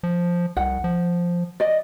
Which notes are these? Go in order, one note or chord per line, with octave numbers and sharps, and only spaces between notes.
F3
C2 F#5
F3
D5 D#5